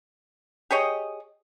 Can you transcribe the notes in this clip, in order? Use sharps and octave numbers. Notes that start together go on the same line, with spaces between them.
G4 G#4 C#5 D#5